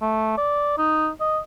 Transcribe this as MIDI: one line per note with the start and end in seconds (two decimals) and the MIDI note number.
0.02 0.35 57
0.38 0.77 74
0.78 1.09 63
1.20 1.39 75